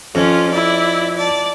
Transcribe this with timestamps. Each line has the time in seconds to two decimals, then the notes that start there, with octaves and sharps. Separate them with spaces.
0.15 F2 C#4 F4
0.51 E4 D5
1.16 D5 A5